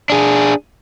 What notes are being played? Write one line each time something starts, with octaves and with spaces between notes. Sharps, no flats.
D4 G#4